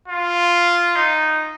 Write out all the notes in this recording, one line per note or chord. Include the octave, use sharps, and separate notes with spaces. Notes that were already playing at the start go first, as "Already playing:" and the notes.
F4
D#4